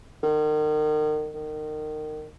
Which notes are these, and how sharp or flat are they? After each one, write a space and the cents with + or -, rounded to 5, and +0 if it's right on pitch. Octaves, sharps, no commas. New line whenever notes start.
D#3 -35
D#3 -25